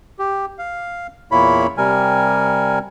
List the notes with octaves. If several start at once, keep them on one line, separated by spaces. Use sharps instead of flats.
G4
F5
E2 A#2 A#3 E4 C#5 B5
C3 G3 A#4 G#5